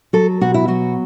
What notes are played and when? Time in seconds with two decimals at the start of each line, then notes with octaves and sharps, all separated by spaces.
0.13 F#3 A4
0.41 B2 F#4
0.54 E4
0.68 F#3 F#4